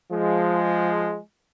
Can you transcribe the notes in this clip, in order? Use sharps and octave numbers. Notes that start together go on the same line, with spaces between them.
F3 G#3